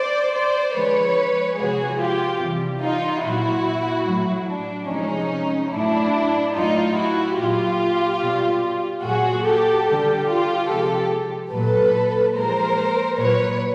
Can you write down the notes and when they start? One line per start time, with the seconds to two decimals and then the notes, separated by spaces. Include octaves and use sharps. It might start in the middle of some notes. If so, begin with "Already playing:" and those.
Already playing: C5 D5
0.33 C5 D5
0.74 D3 F3 G#3 B4 C#5
1.57 C3 F3 G#3 F#4 G#4
1.99 F4 G4
2.40 C3 E3 G3
2.82 D#4 F4
3.23 A#2 F#3 E4 F#4
4.06 A2 F#3
4.48 D4
4.89 C3 F3 G#3 C#4 D#4
5.72 A2 F#3 D4 E4
6.54 A2 F#3 D#4 F4
6.96 E4 F#4
7.38 A#2 F#3 F4 G4
8.20 B2 G3
9.03 A#2 F#3 F#4 G#4
9.44 G4 A4
9.86 D3 G3 G4 A4
10.27 F4 G4
10.69 C3 F3 G#3 G4 A4
11.52 A#2 F#3 A4 B4
12.35 A#2 F3 G#3 A#4 C5
13.18 A#2 F#3 B4 C#5